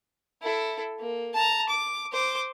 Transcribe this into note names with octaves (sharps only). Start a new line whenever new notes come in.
E4 A4
A#3
A5 A#5
D6
C5 D6